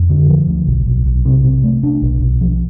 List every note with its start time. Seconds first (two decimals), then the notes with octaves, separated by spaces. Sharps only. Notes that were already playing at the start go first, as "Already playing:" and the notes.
Already playing: F2
0.09 D3
0.29 F3
0.48 D2
0.67 B1
0.86 B1
1.06 B1
1.25 C3
1.44 C3
1.64 A3
1.83 D4
2.02 B1
2.21 B1
2.41 F3